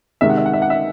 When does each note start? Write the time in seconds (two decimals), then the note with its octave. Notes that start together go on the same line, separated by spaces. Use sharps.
0.21 C3 D#3 G#3 D#4 E5
0.29 F#5
0.37 E5
0.46 F#5
0.53 E5
0.62 F#5
0.70 E5